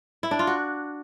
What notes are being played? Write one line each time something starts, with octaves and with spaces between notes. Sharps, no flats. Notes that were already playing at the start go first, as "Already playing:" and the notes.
E4
D4
F4
F#4